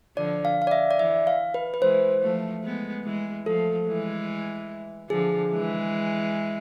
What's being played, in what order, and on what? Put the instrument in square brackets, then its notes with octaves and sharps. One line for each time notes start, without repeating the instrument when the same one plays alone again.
[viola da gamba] D3 F3 [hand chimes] D5
[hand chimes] F5
F5
D5
E5
D5
[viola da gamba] E3 [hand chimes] E5
[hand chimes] F5
B4
B4
[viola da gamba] E3 G#3 [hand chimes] C5
[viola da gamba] F3 A3
G#3 B3
E3 G#3
[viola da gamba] F3 A3 [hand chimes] A4
[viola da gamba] E3 G#3
[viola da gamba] D3 F3 [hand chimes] G#4
[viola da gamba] E3 G#3